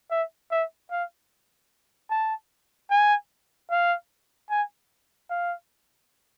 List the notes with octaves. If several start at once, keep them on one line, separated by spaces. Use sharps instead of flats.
E5
E5
F5
A5
G#5
F5
G#5
F5